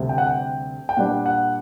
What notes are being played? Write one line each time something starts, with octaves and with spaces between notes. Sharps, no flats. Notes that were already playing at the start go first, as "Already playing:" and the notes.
Already playing: D2 C3 G3
G5
F#5
G5
G5
A#2 G3 D4 F#5
F#5